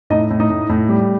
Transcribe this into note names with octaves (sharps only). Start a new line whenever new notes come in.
A2 D#4 D#5
A2
D#4 D#5
A2
A2
G3